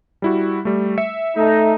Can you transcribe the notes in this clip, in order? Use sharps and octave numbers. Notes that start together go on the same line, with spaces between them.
G3 E4 F#4
G3 A3
E5 C#7
A3 D#4